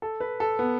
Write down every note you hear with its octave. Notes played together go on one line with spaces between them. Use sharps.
A4
B4
A4
B3